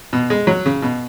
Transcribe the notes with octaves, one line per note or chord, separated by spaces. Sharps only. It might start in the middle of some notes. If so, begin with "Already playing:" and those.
B2
G#3
F#3
C#3
B2